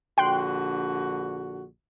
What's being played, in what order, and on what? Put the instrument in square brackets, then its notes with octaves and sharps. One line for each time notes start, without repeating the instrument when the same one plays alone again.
[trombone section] A#1 D3 F#4 [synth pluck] G5 C6 F#6